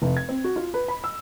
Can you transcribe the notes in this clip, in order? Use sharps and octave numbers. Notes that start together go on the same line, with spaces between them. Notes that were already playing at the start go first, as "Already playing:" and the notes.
F1
G#6
C4
F#4
F4
B4
B5
E6